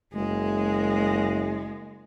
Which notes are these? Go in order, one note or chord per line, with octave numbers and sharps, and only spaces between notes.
F#1 G#3